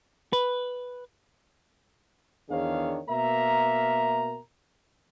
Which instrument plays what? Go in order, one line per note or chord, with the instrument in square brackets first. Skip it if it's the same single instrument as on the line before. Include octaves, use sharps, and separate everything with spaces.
[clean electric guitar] B4
[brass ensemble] E2 D#3 D4 G#4 C#5 F5
B2 A#3 A#4 E5 A#5